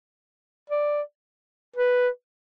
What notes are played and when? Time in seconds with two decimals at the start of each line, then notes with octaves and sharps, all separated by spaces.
0.70 D5
1.76 B4